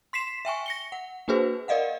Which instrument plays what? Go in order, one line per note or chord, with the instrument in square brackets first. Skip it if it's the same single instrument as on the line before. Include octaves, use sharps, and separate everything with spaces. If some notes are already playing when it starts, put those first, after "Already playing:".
[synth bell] C6 B6 C7 E7
E5 G5 G#5 C#6
A#6 C#7 G7
F#5
A#3 D4 F#4 G#4 B4 C5
A#4 D5 D#5 F5 F#5